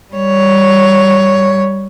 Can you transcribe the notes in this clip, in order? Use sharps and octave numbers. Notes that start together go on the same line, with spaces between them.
G3 C#5